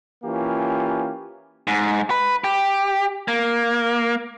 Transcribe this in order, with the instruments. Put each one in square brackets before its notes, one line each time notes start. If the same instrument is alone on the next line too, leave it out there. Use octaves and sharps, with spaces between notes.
[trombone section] E3 A#3 C#4 F4 G4
[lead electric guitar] G#2
B4
G4
A#3